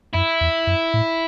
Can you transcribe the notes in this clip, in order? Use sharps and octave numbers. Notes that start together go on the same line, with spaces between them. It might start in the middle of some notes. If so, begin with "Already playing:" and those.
F#2 E4
E2
F#2
A2